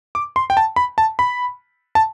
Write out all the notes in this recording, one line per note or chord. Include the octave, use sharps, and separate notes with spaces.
D6
C6
G5
A5
B5
A5
B5
A5